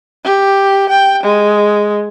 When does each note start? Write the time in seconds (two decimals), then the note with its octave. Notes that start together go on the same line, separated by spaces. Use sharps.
0.24 G4
0.89 G5
1.23 G#3